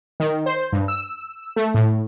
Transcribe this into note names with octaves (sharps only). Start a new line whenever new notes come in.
D#3
C5
G2
E6
A3
A2